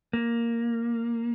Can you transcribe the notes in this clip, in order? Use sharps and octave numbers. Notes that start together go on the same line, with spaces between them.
A#3